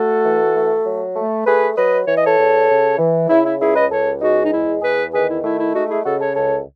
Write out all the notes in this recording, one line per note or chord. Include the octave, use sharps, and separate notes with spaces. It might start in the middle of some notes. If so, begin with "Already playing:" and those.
Already playing: A3 F#4 A4
E3
A3
F#3
A3
A3 G#4 B4
F#3 B4 D#5
E3 C#5
D#5
A4 C#5
E2
C#3
E3
C#3 E4
E4
C#2 E4 G#4
B4 D#5
C#2 A4 C#5
G#3 D#4 F#4
D#4
E2 E4
E2 G#4 B4
D#3 G#4 B4
E4
A3 E4
E4
G#3 D#4 F#4
E4 G#4
C#3 F#4 A4
A4 C#5
C#2 A4 C#5